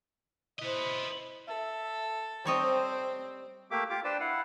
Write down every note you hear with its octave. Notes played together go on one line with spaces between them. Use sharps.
E4 B4 C5 D#5
A4 E5
G3 C4 C5 C#5 D#5
A3 A#3 G4 E5 D6
F4 G4 D6
D4 B4 C5 D5 G5 A5
E4 F5 F#5